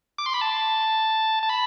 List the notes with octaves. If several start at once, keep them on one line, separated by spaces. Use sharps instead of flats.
D6
C6
B5
A5
A5
B5